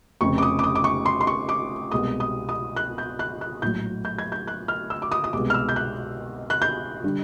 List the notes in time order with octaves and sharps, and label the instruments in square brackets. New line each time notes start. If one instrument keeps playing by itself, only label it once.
[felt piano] F1 F2 C#3 C#6
D6
D#6
D6
D#6
D6
C#6
C6
C6
C#6
D6
C2 B2 G#3 D#6
D#6
D#6
F#6
G6
F#6
F#6
A#1 A2 F#3 G6
G6
G#6
G6
F#6
F6
E6
D6
D#6
D#6
C2 B2 G#3 D6
F6
E6
G6
F#6
F#6
G6
D3 G3